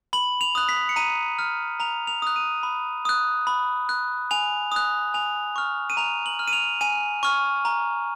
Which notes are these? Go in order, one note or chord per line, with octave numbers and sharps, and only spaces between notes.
B5 F#7
F7
D#6 F#6
B6
C#7
A#5 D#7
F6
A#5 F7
F7
D#6 F#6
D#7
B5
D#6 F#6
B5
F#6
G#5 F7
D#6 F#6
G#5 F7
C#6 F6
D#7
A#5 F7
F#7
F6
D#7
F7
G#5 D#7
C#6 F6
A#5